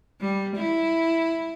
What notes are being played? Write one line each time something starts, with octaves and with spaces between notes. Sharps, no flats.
G3
E4